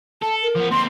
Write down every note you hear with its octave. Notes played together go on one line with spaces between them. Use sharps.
A4 A5
A#4
F3 B3
D#2 C4 C6